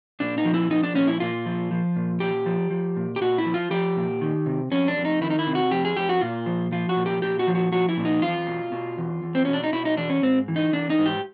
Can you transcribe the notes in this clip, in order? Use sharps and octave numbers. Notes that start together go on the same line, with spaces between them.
A#2 D4
D#4
F3
E4
F3 D#4
D4
A#2 C#4
E4
A#2 F4
F3
F3
A#2
A#2 G4
F3
F3
A#2
G4
A#2 F#4
E4
F3
F4
F3 G4
A#2
D#3
C3
F2 C#4
D4
F2
D#4
D#3 E4
D#4
E4
C3
F#4
F2 G4
G#4
F2 G4
F#4
A#2 F4
F3
F3 F4
F#4
A#2
G4
A#2 G4
F#4
F3
F#4
F3 F#4
E4
A#2
D#4
E2 F4
B2
B2
E2
E2
C4
B2 C#4
D4
D#4
B2 E4
D#4
E2 D4
C#4
G#2 C4
E3
D#4
E3 D4
D#4
G#2
G4